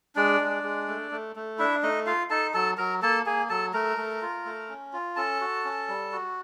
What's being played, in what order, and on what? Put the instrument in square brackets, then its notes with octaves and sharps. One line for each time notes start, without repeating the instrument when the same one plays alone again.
[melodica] G#3 D4 D5
G#3
G#3
A3
A3
A3
D4 E4 E5
A3 D#4 D#5
F4 F5
D#4 A4 A5
F#3 A4 A5
F#3 A#4 A#5
A#3 A4 A5
A#3 G#4 G#5
F#3 A4 A5
A3 A#4 A#5
A3
F4
A3
C#4
F4
C#4 A4 A5
F#4
C#4
G3
F#4